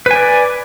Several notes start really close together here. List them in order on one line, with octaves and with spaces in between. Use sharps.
B4 G#5 D5